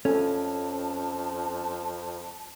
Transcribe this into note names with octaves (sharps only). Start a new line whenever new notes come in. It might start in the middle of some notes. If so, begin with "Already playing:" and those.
F2 C#4 A4 A5